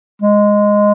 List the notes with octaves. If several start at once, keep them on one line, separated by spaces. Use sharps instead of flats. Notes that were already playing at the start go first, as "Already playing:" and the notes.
G#3